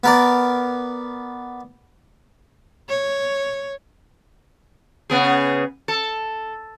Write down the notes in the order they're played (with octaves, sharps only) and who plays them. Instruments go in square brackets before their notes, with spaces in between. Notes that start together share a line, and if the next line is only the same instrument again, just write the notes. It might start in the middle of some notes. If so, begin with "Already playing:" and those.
[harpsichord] B3 A#4 D5
[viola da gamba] C#5
[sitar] C#3 B3 G#4
A4